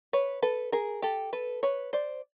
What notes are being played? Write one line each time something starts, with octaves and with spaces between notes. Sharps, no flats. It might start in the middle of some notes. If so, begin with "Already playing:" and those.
B4 C#5
A4 B4
G#4 A#4
G4 A4
A4 B4
B4 C#5
C5 D5